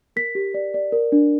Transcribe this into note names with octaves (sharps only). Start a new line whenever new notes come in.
A#4 B6
G4
D5
D5
A#4
D4